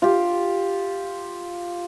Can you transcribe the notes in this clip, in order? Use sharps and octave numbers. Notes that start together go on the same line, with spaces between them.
F4 G4